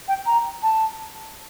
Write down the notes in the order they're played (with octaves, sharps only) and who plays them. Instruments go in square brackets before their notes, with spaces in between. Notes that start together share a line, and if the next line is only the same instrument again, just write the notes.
[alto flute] G5
A#5
A5